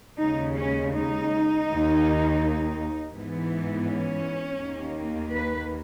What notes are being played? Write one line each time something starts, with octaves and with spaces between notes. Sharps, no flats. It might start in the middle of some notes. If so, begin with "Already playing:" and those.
D#2 C#3 G#3 D#4
C#4
D#4
D#2 D#3 A#3
G#2 E3 B3
C#4
D#2 D#3 A#3
B4